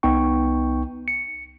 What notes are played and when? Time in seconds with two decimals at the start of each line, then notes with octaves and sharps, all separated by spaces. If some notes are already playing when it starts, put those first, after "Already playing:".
0.03 C2 B3 D#4 G5 C#6
1.08 C#7